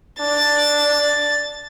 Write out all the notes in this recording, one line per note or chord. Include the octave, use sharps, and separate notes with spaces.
D4 A6